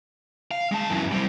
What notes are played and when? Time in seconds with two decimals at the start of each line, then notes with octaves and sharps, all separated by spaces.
0.51 F5
0.72 G#3 A5
0.90 F#2 E3
1.12 G3 C4